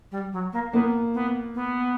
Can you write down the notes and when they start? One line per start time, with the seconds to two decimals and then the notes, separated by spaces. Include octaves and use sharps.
0.12 G3
0.33 F#3
0.53 A#3
0.72 A#3 B3
1.14 B3
1.55 B3